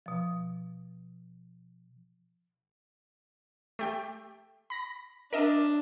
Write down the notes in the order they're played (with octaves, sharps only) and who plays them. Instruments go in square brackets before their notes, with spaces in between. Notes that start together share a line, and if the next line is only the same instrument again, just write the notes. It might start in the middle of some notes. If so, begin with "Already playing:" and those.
[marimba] B2 F3
[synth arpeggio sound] A3 G4 G5
B5 A#6
[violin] D4 [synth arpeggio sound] A#4 D#5 E5